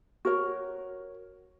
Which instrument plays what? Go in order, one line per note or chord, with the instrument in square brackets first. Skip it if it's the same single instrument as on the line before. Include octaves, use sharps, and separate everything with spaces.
[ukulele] F#4 A#4 C#5